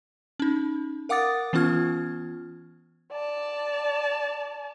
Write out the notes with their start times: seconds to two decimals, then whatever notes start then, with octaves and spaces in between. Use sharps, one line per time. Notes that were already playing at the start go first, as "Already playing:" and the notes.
0.40 C#4 D#4
1.09 A#4 F5 F#5 D6 D#6 A6
1.53 E3 B3 C#4 F4 F6 G#6
3.12 D5 A5